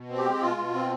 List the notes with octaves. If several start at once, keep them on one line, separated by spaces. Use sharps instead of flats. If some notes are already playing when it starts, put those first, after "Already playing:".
Already playing: B2
C4
G4
G#3
B2 F4
B2
C4